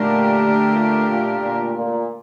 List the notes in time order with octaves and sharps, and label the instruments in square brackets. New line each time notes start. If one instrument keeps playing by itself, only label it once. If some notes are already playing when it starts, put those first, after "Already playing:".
Already playing: [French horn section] A#2 [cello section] D3 A3 D4 G4 A#4
[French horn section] A#2
A#2
A#2
A#2